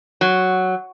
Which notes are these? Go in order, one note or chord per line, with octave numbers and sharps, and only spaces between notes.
F#3